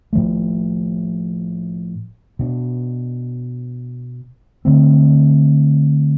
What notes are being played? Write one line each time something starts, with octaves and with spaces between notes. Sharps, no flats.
A2 F3 A3
B2 B3 D4
D3 A3 C4